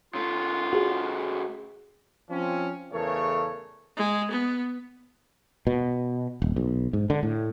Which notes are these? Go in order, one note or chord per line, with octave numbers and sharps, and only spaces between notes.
C#3 A3 F4
F#4 G#4
F3 C4 C#4
E2 C#3 A3 A4 A#4 C#5
G#3
B3
B2
D#1
B1
G#2
D3
A2